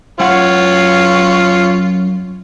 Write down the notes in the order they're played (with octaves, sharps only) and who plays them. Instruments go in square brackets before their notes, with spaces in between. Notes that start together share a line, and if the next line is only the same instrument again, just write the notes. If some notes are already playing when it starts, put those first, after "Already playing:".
[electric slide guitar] F#2 F#5 [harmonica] F4 C#5